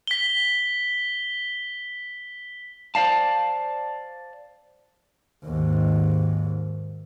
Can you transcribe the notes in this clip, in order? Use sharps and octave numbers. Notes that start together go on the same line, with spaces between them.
B6 G7
C5 D5 F5 A5
D#2 G#2